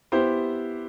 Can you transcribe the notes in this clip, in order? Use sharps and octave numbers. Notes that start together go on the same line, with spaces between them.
B3 E4 G4 C5